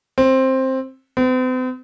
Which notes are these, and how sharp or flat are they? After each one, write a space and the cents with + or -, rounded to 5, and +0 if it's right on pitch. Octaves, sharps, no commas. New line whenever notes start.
C4 +10
C4 -45